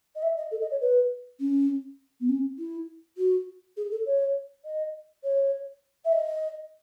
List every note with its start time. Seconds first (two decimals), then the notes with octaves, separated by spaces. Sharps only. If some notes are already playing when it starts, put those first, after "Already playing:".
0.15 D#5
0.22 E5
0.37 D#5
0.51 A4
0.61 D#5
0.71 C#5
0.81 B4
1.40 C#4
2.20 B3
2.29 C#4
2.58 E4
3.17 F#4
3.76 G#4
3.91 A4
4.06 C#5
4.64 D#5
5.23 C#5
6.04 E5
6.12 D#5